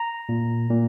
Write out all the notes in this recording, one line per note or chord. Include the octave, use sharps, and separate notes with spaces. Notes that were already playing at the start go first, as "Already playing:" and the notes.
Already playing: A#5
A#2
A#2